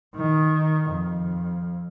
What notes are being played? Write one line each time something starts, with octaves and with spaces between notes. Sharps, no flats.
D#3
F2